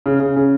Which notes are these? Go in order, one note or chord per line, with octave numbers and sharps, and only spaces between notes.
C#3
C#3
C#3